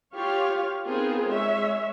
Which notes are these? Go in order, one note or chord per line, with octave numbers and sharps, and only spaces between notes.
F4 G4 C#5 F5
B3 C4 D#4 F4 G#4 A#4
G#3 C#5 E5